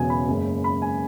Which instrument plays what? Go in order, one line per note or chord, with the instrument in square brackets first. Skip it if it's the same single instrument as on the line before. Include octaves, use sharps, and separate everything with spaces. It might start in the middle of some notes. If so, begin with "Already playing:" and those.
Already playing: [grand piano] E1 E2 C#3 F#3 G#5
B5
F#1 F#2 C#3 G#3
B5
G#5